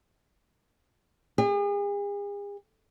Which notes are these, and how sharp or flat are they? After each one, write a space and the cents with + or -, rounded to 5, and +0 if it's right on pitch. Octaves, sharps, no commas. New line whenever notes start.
G#4 -40